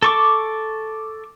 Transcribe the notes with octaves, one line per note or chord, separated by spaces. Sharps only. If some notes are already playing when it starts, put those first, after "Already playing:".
A4 C#6 D6